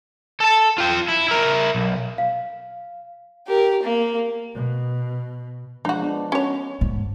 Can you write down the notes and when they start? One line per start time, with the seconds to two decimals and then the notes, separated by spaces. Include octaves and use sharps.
0.40 A4 A5
0.78 F4 G5
1.09 E4
1.28 E4 A#4
1.75 B1
2.18 F5
3.47 G4 A#4
3.83 A#3
4.54 B2
5.85 F3 G#3 D4 D#4 F#4
6.02 B3 D4
6.32 C#4 F#4 C#5
6.81 G#2